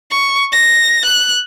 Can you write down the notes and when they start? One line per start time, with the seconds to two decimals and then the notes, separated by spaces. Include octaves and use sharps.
0.11 C#6
0.52 A#6
1.05 F#6